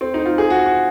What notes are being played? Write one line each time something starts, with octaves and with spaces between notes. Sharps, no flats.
C4
D#4
F4
G#4
F#4
F#4